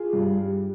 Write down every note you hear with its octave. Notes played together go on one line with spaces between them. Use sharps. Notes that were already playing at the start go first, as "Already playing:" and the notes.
Already playing: F4 G#4
G2
G3